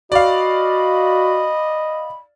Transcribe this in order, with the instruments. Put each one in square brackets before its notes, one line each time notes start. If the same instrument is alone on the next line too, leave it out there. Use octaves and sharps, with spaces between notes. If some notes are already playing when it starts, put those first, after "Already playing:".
[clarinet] F#4 [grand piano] D5 F5 [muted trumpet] D#5 [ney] B5